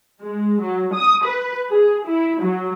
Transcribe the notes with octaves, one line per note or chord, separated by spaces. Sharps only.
G#3
F#3
D#6
B4
G#4
E4
F#3